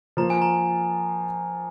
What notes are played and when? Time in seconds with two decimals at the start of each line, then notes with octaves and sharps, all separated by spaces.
0.17 F3 A#3 F4 A#5
0.30 G#5
0.42 A#5